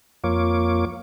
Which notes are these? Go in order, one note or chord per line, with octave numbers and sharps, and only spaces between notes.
F2 A#3 F4 C#5 D6